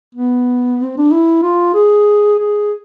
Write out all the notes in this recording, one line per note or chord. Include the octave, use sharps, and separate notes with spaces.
B3
C4
D4
E4
F4
G#4
G#4